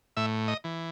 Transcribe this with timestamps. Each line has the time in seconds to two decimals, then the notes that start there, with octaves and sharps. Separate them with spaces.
0.17 A2 E5
0.48 D#5
0.64 E3